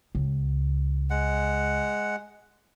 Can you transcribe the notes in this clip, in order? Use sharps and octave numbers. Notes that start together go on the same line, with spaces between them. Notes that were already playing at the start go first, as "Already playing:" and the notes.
C#2
G#3 F#5